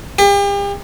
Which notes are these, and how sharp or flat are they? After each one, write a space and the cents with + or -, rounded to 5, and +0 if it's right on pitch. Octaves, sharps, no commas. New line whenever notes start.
G4 +40